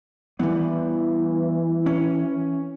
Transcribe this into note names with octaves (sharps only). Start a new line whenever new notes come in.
E3 G3 B3
C#4